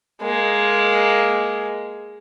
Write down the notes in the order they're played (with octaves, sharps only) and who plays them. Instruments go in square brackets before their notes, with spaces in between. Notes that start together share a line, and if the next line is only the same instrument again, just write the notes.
[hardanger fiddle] G#3 A#3